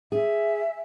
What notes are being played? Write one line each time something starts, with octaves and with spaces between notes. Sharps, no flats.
G#4 E5